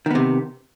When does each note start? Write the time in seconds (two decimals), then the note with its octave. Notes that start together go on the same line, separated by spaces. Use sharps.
0.06 D#3
0.11 B3
0.15 C3